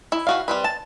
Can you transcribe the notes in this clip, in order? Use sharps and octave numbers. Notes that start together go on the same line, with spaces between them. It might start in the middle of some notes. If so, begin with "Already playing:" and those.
E4
E3 F#4 F5
G3 C4 B4
A5